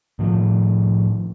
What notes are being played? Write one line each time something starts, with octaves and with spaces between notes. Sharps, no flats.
A2 D#3 F3